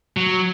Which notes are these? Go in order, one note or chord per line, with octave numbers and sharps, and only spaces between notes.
F#3